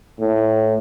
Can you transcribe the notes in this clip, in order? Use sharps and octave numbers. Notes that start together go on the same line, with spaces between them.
A2